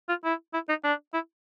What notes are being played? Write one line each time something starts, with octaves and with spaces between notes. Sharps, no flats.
F4
E4
E4
D#4
D4
E4